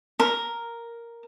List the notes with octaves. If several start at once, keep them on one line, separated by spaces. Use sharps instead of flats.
A#4